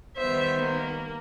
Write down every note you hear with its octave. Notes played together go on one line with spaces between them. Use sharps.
D#3 G3 B3 C5 E5
A#3